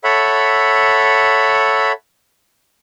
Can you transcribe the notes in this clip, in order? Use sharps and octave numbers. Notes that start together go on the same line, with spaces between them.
A4 C#5 E5 F#5 B5